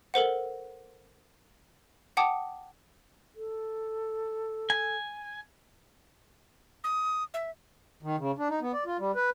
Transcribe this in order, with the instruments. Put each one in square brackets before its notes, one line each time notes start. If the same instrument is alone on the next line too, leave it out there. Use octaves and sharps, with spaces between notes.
[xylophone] A4 A#4 C5 F#5
F#5 G5 A5 D6 D#6
[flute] A4
[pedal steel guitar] G#5
[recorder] D#6
E5
[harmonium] D#3
C#3
D4
D#4
B3
D5
F4
G3
B4